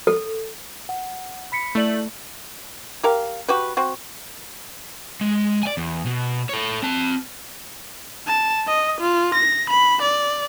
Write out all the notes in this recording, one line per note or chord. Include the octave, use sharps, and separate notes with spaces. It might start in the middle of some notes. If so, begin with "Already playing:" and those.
A4
F#5
B5 B6 C#7
A3 E4 D5 F#7
G4 A#4 F5
F#4 G4 B4
C4 F#4
G#3
D5 G#5
E2
B2
A4 C#5
C4 A5
A5
D#5
F4
A#6
B5
D5